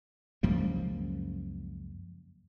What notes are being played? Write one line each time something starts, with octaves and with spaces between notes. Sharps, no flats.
C#2 F#2 F3 A#3